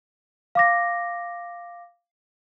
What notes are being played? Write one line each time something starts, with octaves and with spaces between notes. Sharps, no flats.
F5 D6 A#6